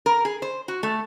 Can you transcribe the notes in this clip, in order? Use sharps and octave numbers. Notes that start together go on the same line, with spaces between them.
A#4
G#4
C5
F#4
A3